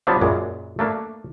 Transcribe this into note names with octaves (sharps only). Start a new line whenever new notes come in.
F#3 G3 B3 C4 D4 F4
F#2 A#2 G#3
A3 A#3 D4